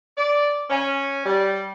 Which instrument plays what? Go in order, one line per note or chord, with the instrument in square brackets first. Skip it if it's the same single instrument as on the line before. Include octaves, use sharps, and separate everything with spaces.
[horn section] D5
C#4
G3